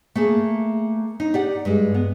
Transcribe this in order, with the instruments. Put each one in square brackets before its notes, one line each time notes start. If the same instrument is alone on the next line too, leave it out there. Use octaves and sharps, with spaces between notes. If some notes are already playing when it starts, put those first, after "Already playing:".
[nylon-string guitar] A3 A#3 G#4
D#4
G4 D5 F#5
G2 G3 G#3
B3